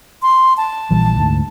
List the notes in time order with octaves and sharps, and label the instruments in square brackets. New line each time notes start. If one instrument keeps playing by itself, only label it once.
[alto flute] C6
A5
[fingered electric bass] A#1 E3 G3
D2 G#2